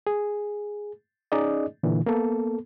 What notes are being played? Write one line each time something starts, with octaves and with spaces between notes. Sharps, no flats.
G#4
C#4 D#4 G#4 D5 D#5
A#2 D3 E3
A#3 B3 A4